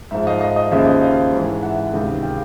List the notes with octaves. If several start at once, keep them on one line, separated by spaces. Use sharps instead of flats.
G#2 F3 E5
D#5 F5
D#5
D#5
D#2 C#3 F3 E5
D#5
D#5 F5
G#2 E3
E5 F#5
C#2 C3 D#3
F5 G5